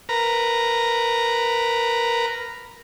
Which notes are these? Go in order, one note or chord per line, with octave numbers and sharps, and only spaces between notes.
A#4 B4 A#5